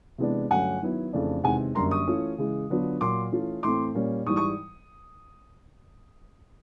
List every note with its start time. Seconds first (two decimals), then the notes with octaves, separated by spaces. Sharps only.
0.18 C3 E3 G#3 B3 D4
0.50 G2 D3 F#3 A3 C#4 F#5 G#5
0.81 D#3 F#3 B3 E4
1.13 F2 C#3 E3 A3 D4
1.44 E2 C3 D#3 G#3 F#5 G#5
1.75 F#2 D3 G3 A#3 A#5 C6
1.91 C#6 D#6
2.07 E3 A3 C#4 F4
2.38 C#3 E3 G#3
2.70 D3 F#3 B3 D4 F4
3.01 A#2 F#3 A#3 C6 D6
3.32 E3 A3 C#4 F4
3.63 A2 E3 A3 C4 C6 D6
3.94 A#2 G3 A#3 C#4
4.26 G#2 E3 G3 C#6 D#6
4.36 C#6 D#6